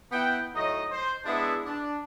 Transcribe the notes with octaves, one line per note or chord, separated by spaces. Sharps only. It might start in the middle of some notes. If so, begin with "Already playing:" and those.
B3 E4 F#5 G5
A2 F#3 D#4 D#5
C5
G#3 B3 D4 E4 G#4 E5
D4